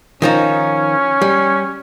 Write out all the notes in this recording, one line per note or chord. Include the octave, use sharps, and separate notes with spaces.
D#3 F3 C#4 D#4
G3